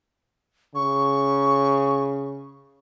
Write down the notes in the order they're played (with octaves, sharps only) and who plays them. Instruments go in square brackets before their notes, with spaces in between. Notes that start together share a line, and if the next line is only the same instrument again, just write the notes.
[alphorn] C#3 [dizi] C#6